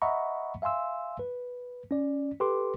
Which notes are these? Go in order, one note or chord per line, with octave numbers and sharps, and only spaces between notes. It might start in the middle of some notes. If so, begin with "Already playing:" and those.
D#5 E5 F#5 A#5 B5 C#6
E5 F5 G#5 C6 E6
B4
C#4 D5
G4 A4 B4 C6 D6